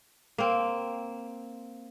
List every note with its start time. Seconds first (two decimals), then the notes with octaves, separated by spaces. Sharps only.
0.38 A#3 C4